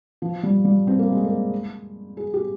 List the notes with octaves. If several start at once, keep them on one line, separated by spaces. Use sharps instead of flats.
F3
G3
G3
C4
A#3
G#3
A#3
G#4
G4